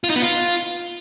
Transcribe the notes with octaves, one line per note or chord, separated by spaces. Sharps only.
F4
D#4
B3
F4